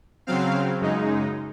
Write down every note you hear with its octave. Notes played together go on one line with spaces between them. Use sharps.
C#3 F#3 C4 F5
F#2 C#3 G#3 D#4